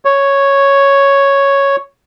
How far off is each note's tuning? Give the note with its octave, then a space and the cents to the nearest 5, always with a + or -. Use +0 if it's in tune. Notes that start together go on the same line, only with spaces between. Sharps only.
C#5 +0